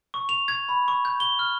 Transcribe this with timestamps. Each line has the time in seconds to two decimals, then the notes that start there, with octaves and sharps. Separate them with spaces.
0.14 C#6
0.29 F7
0.48 G#6
0.69 B5
0.88 C#6
1.05 G6
1.20 G7
1.39 F6